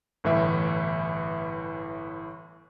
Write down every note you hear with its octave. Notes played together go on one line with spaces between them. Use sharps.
G1 A2 E3 E5